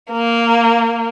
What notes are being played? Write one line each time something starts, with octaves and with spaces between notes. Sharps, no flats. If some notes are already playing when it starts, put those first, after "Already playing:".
A#3